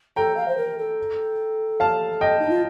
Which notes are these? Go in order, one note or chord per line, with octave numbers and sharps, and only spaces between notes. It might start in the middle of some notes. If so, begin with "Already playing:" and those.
A4 G5 A#5
F5
C5
A#4
A4
F5 A5
D#5 G5
D#4
F4